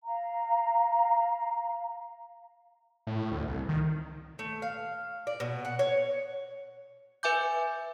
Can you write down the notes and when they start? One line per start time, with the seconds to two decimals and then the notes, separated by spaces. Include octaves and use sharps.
0.04 F5 A#5
3.07 A2
3.32 D2
3.47 C2
3.69 D#3
4.39 A3
4.62 F5
5.27 D5
5.40 B2
5.65 F#5
5.79 C#5
7.23 B4 E5 G#5 D6 G6